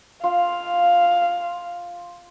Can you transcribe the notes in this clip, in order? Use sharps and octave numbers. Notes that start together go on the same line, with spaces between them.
F4 F5